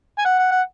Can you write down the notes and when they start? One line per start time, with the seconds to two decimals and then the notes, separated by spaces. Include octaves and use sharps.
0.19 G#5
0.26 F#5
0.39 F#5
0.52 F#5